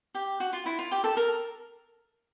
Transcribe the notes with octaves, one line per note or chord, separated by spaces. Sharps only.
G4
F#4
F4
E4
F4
G4
A4
A#4